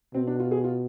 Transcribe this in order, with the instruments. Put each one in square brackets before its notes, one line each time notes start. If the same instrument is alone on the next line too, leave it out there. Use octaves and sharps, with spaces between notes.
[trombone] B2 [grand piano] C4
[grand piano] D4
F4
G#4
F4